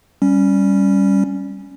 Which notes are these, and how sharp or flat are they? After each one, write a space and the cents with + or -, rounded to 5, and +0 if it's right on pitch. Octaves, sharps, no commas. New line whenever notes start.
G3 +0 C#4 +0